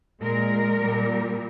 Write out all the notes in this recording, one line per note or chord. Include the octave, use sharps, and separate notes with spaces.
A#2 G#3 A#4
A#2 G3